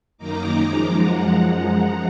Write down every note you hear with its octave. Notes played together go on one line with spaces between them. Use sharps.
F#2 D#3 A#3 D#4 A#5 D6
F#2 F3 G#3 D#4
F#2 F3 G#3 F#5 A#5